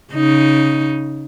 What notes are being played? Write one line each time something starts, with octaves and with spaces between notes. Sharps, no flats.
C#3 D#4